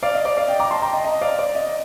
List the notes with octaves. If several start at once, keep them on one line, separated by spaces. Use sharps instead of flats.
D5 F5
D#5
D5
D5 F5
D#5 G5
A#5 D6
A5 C6
G5 A#5
D#5
D#5
D5 F5
D5
D#5